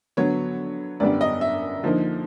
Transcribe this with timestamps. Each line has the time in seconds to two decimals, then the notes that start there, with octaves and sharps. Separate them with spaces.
0.17 D3 F#3 B3 C#5
1.00 F#2 D3 G3 B3 D4 D5
1.21 D#5
1.41 E5
1.83 D3 F3 A#3 D#4